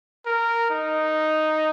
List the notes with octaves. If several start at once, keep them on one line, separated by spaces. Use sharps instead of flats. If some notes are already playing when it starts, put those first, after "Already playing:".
A#4
D#4